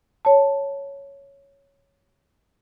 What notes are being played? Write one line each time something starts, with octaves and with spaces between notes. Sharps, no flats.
C#5 A5